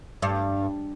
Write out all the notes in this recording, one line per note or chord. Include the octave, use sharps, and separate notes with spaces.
G2